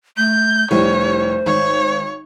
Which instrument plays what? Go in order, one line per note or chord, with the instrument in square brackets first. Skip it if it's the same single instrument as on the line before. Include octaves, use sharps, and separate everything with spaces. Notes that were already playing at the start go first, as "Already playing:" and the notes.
[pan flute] A3 [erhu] G6
[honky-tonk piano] F1 G3 E4 [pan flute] C5 [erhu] C#5
[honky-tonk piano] G#1 [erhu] C#5